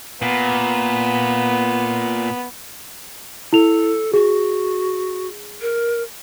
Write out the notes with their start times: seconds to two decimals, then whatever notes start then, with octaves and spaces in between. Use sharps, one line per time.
0.22 A#2 B3
3.53 E4 A4 F7
4.13 F#4 G#4
5.62 A#4